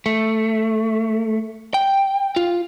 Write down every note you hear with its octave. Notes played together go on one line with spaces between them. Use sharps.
A3
G5
F4